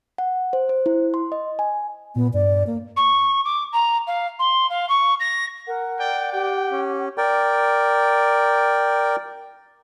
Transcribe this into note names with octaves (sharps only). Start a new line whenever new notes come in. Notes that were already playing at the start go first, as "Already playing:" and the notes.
F#5
C5
C5
E4
C6
D#5
G#5
A#2 B3
G2 D5
A#3
C#6
D6
A#5
F5
C6
F5
C#6
A#6
A#4 F#5
D5 G5
G4 G5
C#4
A#4 D5 G5